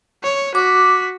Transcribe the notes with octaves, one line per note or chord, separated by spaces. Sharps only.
C#5
F#4 D6 B6